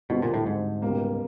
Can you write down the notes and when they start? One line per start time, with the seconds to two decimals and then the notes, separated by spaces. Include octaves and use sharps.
0.10 D2 B2 D3 G3 C4
0.22 A#2
0.34 A2
0.46 G#2
0.82 C#2 B2 G3 A#3